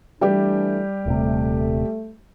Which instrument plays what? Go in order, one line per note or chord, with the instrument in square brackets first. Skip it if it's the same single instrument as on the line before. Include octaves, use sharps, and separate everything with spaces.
[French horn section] E3 A3 D4 [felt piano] G3 G4
[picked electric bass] D#1 C3 [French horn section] A3